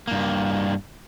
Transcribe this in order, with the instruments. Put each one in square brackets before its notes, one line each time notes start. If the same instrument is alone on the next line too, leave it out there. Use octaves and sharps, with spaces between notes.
[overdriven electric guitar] G2 A#3